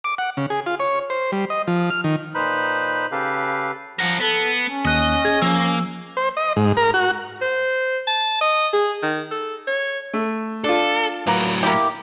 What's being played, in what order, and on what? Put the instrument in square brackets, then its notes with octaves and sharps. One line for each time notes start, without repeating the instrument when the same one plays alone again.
[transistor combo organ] D6
F#5
C#3
G#4
F4
C#5
C5
G3
D#5
F3
F6
D#3
[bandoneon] A#2 D#4 B4 C5 B5
C#3 G4 A4 B4 F5
[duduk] F3 [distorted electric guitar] A#4 F#5
[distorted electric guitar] B3 [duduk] A4
[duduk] C#4
[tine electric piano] D#2 F#6 [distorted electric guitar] D#5
[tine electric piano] G#4 G#6
[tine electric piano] F3 E6 [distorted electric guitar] A#3
[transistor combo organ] C5
D#5
G#2
A#4
F#4
[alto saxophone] C5
A5
D#5
G#4
D#3
A4
C#5
[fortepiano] A3
[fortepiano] D4 F4 [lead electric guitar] A4
[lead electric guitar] A2 F#3 [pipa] A#3 B4
[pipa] A#3 E4 G4